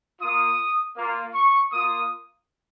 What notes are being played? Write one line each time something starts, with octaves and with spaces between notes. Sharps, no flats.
A#3 F4 D#6
A#3 F4
C#6
A#3 F4 D#6